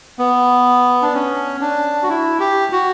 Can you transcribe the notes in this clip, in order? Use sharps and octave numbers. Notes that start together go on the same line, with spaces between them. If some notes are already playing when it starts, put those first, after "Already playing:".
B3
D4
C#4
D4
F#4
E4
G4
F#4